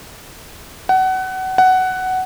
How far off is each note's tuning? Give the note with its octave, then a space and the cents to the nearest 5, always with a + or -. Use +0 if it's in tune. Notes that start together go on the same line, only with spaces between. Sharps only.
F#5 +25
F#5 +10